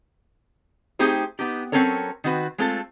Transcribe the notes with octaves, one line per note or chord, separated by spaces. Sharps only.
A3 C4 D#4 G4 G#4 C5
B3 D#4 G4
F#3 C4 C#4 A4 A#4 C#5
D#3 C4 F#4 B4
G#3 A3 C4 F4 A4